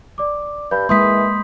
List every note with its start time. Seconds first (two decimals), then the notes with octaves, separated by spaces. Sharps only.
0.18 D5 D6
0.71 G2 B5 G6
0.89 E3 G#3 A#3 C6 D#6 B6